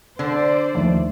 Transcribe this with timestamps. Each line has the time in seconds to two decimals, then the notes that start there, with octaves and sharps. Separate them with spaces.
0.19 D3 C5 D5
0.75 D#2 D#3 F3 A3